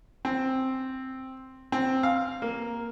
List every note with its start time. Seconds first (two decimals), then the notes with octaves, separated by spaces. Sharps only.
0.25 C4
1.72 C4
2.03 F5
2.42 A#3